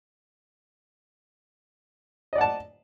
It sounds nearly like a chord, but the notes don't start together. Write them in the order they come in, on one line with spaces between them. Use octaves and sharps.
D#5 D5 F#5 A5